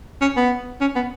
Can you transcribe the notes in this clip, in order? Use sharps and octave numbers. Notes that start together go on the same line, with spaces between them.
C#4
B3
C#4
B3